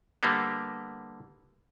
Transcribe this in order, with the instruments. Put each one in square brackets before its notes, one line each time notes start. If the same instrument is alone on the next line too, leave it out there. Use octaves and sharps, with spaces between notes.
[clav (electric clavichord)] D3 G3 A#3 B3